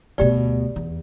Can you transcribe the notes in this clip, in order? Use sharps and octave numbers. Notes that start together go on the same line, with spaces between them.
D2 B2 G4 D5
E2